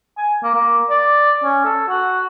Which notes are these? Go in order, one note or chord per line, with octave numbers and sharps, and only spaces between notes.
G#5
A#3
A#3
D5
C#4
A4
F#4